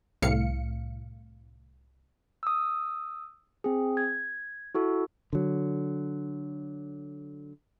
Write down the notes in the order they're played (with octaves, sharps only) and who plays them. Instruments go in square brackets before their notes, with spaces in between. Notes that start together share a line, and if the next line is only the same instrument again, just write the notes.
[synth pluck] C2 A2 F5 C#7
[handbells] D#6 E6
C4 G#4
G#6
E4 F#4 A4
[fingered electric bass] D3 F#3